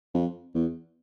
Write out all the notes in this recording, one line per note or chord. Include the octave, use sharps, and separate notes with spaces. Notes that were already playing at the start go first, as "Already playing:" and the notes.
F2
E2